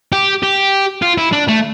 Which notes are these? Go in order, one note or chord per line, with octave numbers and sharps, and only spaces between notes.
G4
G4
F4
E4
D4
A3